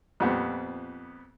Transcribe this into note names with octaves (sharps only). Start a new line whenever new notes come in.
F2 A#2 G3 B3 C4